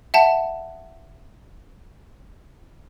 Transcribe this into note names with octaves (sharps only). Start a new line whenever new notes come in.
E5 F#5 A5